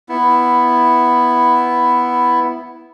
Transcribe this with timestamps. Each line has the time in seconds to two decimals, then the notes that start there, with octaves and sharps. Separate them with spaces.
0.09 B3 E4